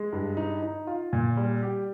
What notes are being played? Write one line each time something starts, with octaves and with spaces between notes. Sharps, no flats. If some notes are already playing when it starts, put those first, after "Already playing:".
Already playing: G#3
G2
D#4
D#4
F4
A#2
G3
G4